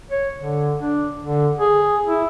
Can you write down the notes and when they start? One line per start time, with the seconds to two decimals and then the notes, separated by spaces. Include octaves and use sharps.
0.11 C#5
0.37 D3
0.80 D4
1.25 D3
1.59 G#4
2.06 E4